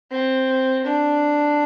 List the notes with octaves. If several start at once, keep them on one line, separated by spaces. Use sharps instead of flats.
C4
D4